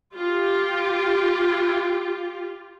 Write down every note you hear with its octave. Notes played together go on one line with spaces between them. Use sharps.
F4 G4